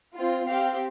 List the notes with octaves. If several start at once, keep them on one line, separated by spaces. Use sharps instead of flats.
C4 F4
C4 G4 F5